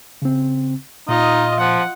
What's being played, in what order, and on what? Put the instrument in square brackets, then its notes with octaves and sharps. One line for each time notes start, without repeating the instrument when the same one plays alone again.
[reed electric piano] C#3 C4
[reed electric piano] A#2 [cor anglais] D#4 [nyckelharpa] F4 D#5
[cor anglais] F3 [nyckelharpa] F#5